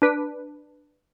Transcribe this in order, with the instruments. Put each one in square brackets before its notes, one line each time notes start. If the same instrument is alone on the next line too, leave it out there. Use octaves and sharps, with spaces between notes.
[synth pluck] D4 B4